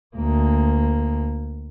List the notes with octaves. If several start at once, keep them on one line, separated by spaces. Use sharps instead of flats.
D2 A#3